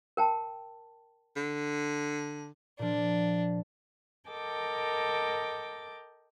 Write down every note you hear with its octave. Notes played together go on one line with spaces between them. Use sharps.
A#4 G5 A5
D3
A#2 F3 D4
A4 A#4 D#5 G5 D6